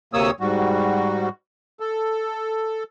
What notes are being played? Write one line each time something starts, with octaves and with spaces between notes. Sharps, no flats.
D2 C3 A#3 C#5 D#6 E6
G#2 G3 F#4
A4